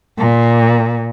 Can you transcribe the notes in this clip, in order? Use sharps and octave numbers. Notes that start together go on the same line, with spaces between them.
A#2